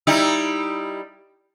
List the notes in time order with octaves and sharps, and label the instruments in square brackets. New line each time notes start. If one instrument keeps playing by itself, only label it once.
[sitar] G3 D#4 E4